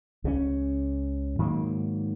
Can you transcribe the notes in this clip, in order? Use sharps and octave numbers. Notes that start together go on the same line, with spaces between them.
C#2 C#3 G#3 C#4
G#2 D#3 F#3 A#3